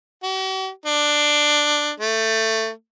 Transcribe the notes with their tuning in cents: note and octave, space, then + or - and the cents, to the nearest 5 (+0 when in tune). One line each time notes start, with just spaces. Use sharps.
F#4 +45
D4 +10
A3 +15